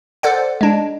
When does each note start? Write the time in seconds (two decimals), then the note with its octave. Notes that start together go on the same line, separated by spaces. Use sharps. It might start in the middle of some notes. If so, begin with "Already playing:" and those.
0.23 A4 C5 D5 F#5
0.61 G#3 D4